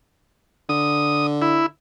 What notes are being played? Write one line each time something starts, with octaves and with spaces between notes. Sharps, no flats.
D3 D#6
E4